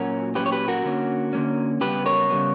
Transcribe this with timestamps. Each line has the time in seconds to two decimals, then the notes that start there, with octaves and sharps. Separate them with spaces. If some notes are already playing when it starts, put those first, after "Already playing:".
Already playing: A#2 F#3 C#4 F#4 A#4
0.35 A#2 F#3 C#4 G4 B4
0.46 C#5
0.52 G4 B4
0.68 F#4 A#4
0.85 D3 A#3 C#4
1.33 D3 A#3 C#4
1.81 C#3 G3 B3 G4 B4
2.06 A#4 C#5
2.30 C#3 G3 B3